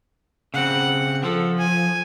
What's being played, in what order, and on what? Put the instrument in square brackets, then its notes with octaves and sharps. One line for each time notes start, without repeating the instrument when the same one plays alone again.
[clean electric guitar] C#3 C4 [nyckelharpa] F#5
[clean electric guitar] F3 [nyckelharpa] A4
[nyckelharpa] G#5